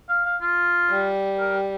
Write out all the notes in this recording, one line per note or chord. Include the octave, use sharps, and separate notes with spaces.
F5
F5
F4
G3
A#4